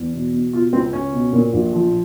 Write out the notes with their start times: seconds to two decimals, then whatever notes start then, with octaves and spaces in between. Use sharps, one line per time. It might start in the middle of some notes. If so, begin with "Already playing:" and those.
Already playing: E2
0.13 B2
0.33 B2
0.53 B2 F4
0.73 C#2 C4
0.93 C#2 C#4
1.13 B2
1.33 A#2
1.53 A#1
1.73 F3